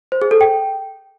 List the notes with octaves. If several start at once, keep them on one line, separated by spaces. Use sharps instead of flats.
C5
G#4
A4
G5